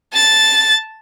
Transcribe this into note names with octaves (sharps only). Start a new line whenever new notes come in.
A5 A6